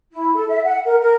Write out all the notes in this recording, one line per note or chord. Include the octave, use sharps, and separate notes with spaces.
E4
A4
E5
F#5
A#4
A#4